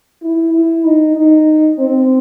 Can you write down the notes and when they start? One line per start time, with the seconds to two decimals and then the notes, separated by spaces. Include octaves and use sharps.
0.22 E4
0.53 E4
0.84 D#4
1.15 D#4
1.78 C4